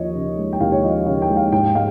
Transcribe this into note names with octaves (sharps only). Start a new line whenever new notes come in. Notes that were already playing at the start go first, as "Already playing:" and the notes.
Already playing: D#2 F3 C#5 D#5
C#3
G#3
G5
D#2 F5
C#5
F3 D#5
C#3 F5
G5
G#3
F5
G#2 G5
G#3 F5